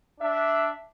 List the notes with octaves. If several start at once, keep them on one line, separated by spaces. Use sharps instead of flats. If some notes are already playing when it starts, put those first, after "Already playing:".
D4 E5